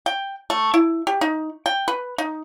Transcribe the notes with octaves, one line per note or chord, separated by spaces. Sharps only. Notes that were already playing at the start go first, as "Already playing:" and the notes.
G5
A3
E4
G4
D#4
G5
B4
D#4